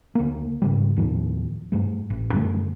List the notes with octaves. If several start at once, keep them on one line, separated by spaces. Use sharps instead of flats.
D2 A#3
G#2 C#3 G3
D#2 A2 D#3 F3
G2 G3 A3
A1
F#2 D3 G3 A3